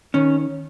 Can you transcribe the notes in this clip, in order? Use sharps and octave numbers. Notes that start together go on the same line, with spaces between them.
D#3 C#4